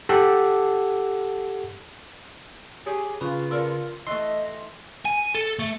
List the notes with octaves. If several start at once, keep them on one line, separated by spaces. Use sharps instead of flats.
G4 A4 F#5 A5 D6 E6
G4 G#4 C#5 G#5
C#3 F4 B4
A4 A#4 D5
E3 A3 D#5 C6
G#5
A4
A3